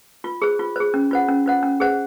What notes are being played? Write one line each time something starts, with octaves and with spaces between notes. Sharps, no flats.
F4
G#4 C5
F4
G#4 C5
C#4
F4 C5 F#5
C#4
F4 C5 F#5
C#4
G#4 C5 F#5